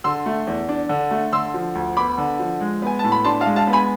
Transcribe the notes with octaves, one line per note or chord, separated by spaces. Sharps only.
D3 C6 E6
A3
E2
D4
D3
A3
D3 C6 E6
F3
D2
B3 B5 D6
D3
F3
G#3
B3 G#5
A2 A5
B5
D4 A5 C6
F5 A5
G#3
F5 A5
B3
G#5 B5